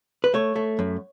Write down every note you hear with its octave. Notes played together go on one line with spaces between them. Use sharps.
B4
A3 C#5
A3
F#2